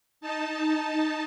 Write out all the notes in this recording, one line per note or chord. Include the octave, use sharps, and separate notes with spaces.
D#4 A5